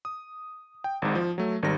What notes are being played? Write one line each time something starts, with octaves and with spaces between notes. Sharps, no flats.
D#6
G5
G#1 G#2
F3
F#3 A3
G#1 D#3 G3 A#6